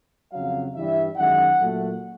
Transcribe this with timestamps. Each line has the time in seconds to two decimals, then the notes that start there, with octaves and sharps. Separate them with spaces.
0.32 F2 C#3 F#3 F5
0.75 G2 E3 G3 E5
1.17 F#2 D#3 G#3 F#5
1.60 A#2 F#3 A3